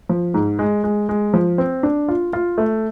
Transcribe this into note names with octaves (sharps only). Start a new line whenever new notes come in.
F3
G#2
G#3
G#3
G#3
F3
C4
D4
F4
F4
A3